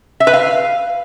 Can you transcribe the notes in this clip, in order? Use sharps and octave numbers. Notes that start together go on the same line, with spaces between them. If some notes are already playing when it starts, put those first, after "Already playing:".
E5
B4
F5